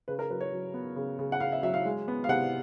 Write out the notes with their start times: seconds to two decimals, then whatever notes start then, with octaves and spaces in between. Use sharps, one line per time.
0.08 C#3 B4
0.19 A#4
0.30 F#3 B4
0.41 C#5
0.52 F#3
0.74 B3
0.96 C#3
1.19 C#3
1.32 F#5
1.40 C#3 F5
1.52 E5
1.63 F#3 E5
1.74 F5
1.85 G#3
2.08 B3
2.24 F5
2.29 C3 F#5